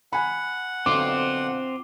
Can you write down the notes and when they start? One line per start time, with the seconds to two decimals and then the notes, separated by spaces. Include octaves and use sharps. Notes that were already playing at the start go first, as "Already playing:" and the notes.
0.13 F#5 G#5 B5
0.86 B1 B2 D3 C4 F4 D6